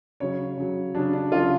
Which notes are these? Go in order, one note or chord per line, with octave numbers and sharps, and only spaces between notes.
C#3 F#3 C#5
C#3 F#3
C#3 F#3 D4
D4
C#3 F#3 F4